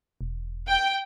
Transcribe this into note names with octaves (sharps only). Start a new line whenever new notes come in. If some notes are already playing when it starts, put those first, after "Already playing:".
E1
G5